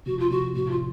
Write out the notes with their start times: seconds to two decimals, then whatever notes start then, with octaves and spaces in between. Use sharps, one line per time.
0.06 F1 F#4
0.19 F4
0.30 F1 F#4
0.54 A2 F#4
0.70 F4